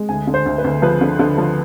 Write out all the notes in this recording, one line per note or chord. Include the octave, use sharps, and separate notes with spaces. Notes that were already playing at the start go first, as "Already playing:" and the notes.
Already playing: G#3
D2 G#5
D3
C5
D2
B4
D2
F3 B4
D3
D3
F3